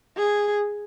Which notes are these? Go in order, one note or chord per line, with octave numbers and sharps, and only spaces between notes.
G#4